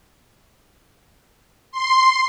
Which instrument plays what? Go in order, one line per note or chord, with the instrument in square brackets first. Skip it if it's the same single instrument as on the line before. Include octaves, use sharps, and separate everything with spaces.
[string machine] C6